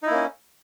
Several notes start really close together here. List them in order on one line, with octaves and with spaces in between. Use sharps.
D#4 E4 A#3 C#4